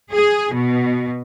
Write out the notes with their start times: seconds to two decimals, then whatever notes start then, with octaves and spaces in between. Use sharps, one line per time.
0.11 G#4
0.54 B2